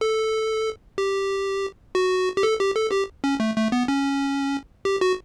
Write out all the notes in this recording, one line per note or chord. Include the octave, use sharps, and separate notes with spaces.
A4
G4
F#4
G4
A4
G4
A4
G4
C#4
A3
A3
B3
C#4
G4
F#4